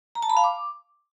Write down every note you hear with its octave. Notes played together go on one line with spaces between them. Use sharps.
A#5
A5
B5
F5
D6